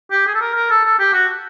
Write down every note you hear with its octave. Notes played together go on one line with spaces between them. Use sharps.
G4
G#4
A4
A#4
A#4
A4
A4
G4
F#4